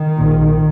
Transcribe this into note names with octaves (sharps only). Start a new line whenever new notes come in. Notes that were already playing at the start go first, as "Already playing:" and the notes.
Already playing: D#3
A#1 A#2